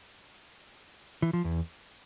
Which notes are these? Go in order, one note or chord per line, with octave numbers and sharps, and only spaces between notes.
E3
F3
E2